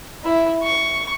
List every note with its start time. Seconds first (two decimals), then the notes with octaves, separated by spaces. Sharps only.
0.24 E4
0.63 C#6